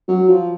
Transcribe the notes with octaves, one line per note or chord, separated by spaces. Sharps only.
F#3
F3